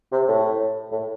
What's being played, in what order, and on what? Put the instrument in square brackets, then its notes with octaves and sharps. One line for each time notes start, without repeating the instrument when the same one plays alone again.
[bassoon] C3
A2
A2